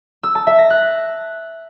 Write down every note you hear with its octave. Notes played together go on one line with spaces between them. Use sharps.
E6
A5
E5
A#6
F#6